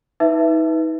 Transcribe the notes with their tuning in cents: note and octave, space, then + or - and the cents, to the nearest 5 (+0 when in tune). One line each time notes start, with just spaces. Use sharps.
D#4 +35 B4 +0 E5 +5